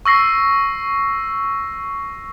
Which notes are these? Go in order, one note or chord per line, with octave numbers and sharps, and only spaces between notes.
C#6 E6 A#6 C7